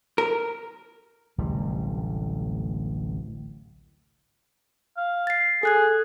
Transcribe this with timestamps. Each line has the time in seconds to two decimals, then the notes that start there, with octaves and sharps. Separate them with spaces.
0.18 A#4
1.38 D1 A1 C3 G3
4.97 F5
5.27 A6 C7
5.63 G#4 A4 F#6 G#6